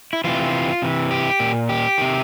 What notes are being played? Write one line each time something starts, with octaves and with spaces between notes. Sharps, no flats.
E4
C3 E3 F4
C3 E3
G4
A#2
G4
C3 D#3